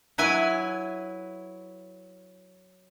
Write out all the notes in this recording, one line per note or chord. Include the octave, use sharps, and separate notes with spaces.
F#3 E4 B4 G#5